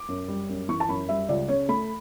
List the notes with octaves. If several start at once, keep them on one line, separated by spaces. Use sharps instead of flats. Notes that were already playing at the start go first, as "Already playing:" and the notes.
Already playing: D6
F#2
G3
F#2
E3 C#6
A5
F#2 B5
G3 E5
C#2 D5
C#3 C#5
A3 B5